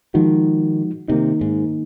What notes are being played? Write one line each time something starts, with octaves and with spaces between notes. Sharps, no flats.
D#3 F3 G#3 D#4 F#4
C3 D#3 A#3 D#4
G#2